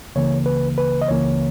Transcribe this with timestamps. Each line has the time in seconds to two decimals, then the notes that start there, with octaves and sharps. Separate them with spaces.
0.16 C#2 C#3 E3 A#3 C#5
0.46 B4
0.78 B4
1.02 D#5
1.08 C#2 C#3 E3 A#3 C#5